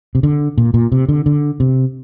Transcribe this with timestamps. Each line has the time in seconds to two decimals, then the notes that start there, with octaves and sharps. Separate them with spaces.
0.15 C3
0.23 D3
0.58 A#2
0.74 A#2
0.92 C3
1.09 D3
1.26 D3
1.60 C3